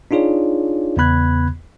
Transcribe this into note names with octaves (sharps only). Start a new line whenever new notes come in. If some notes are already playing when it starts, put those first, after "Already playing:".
D4 D#4 F4 G#4 C#5 D5
E2 C#3 B3 B5 F#6 G#6